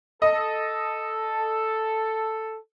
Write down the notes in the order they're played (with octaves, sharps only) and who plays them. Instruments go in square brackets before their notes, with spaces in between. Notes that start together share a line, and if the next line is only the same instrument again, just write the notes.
[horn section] A4 [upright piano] D#5